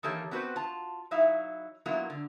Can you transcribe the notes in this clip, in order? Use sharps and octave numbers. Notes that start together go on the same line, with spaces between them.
D#3 E3 A#3 G4 A4 C#5
B3 C4 F#4 G4 B4 C5
F4 A5
F#3 D#4 E4 E5 F5
F#3 A#3 B3 E4 F4
D3